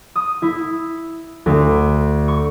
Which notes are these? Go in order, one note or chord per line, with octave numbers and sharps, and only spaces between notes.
D#6
E4
D2
C#6